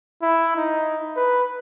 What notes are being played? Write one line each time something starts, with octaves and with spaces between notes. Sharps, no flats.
E4
D#4
B4